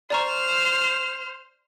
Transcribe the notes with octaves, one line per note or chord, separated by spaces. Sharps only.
C5 D5 A#5 C#6 F6